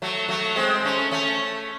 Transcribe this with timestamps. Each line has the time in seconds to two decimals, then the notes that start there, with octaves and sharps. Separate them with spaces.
0.02 F#3 A3
0.28 F#3 A3
0.56 G#3 C4
0.85 A3 C#4
1.11 A3 C#4